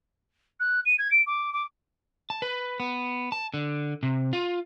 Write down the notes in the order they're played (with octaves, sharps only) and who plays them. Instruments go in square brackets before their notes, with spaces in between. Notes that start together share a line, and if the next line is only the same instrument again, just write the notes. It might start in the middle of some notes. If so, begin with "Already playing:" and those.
[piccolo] F#6
D#7
G#6
D7
D6
D6
[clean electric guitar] A5
B4
B3
A5
D3
C3
F4